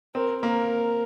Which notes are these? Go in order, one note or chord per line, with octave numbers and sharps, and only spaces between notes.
C4 A#4
A#3 A#4